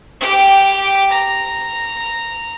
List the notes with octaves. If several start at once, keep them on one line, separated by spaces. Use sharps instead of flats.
G4 G5
A#5